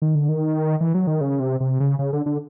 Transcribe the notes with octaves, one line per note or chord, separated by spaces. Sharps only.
D#3
D3
D#3
E3
F#3
D#3
C#3
C3
C3
C#3
C#3
D3
D3